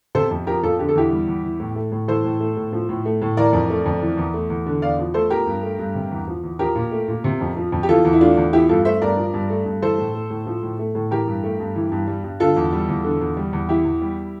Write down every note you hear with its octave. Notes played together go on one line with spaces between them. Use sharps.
C3 A4 C5
F2
F3 G4 A#4
F2 F4 A4
D3 G4
A4
E2 E4 G4
G3
E2
E3
A2
A3
A2
E3 A4 C5
A2
A3
A2
F3
A2
A3
A2
E3 A#4 D5
F2
A3
F2
E3
E2
A3
E2
D3
E2 D5 F5
F3
A3 A4 C5
F3 G4 A#4
G2
A3
G2
C3
E2
F3
E2
F3 G4 A#4
A#2
A3
A#2
C3
F2
F3
F2
G4
E3 F4 A4
E2
E4
A3 D4 F4
E2
F3 E4 G4
G2 F4 A4
A3 C5 E5
G2 A#4 D5
F3
G2
A3
G2
E3 A4 C5
A2
A3
A2
F3
A2
A3
A2
E3 G4 A#4
G2
A3
G2
E3
G2
G3
G2
D3 F4 A4
E2
G3
E2
D3
E2
G3
E2
E3 E4 G4
E2
G3